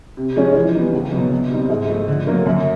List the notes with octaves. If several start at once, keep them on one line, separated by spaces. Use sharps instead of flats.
C3
F3 G#3 C#4
E3
G3 B3 D#4
C#2
B2 F#3
B2
G3 C4 D#4
G#2
F3 A3
D3
F#3 A#3
F#2